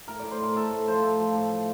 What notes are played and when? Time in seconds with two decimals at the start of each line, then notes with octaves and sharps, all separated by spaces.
0.07 A2 A#4
0.19 A2 D5
0.31 C5
0.40 A2 A#4
0.56 A2 A4
0.71 A2
0.88 F3 C5
1.03 A2 A4
1.19 F3
1.35 A2
1.51 F3